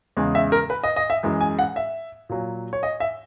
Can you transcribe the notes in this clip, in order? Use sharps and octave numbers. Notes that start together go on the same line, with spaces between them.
E2 C#3 G#3
E5
A#4
B4
D#5
D#5
E5
F#2 E3 G#3
G#5
F#5
E5
A#2 F#3
C#5
D#5
E5